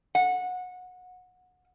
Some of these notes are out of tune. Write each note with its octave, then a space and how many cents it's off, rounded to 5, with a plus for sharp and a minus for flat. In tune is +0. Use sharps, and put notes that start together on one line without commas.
F#5 -20